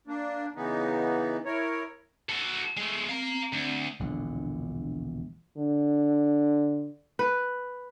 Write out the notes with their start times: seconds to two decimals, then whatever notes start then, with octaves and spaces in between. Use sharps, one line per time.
0.07 A#3 D4
0.56 C#3 E3 B3 D#4
1.45 E4 A#4 C#5
2.29 F#4 A4
2.77 G#3 A3
3.09 C4 F5 A#5
3.32 C4
3.53 D2
4.00 E1 A#1 D#2 D3
5.58 D3
7.19 B4